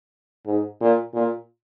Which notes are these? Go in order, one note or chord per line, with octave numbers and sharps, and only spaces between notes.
G#2
A#2
A#2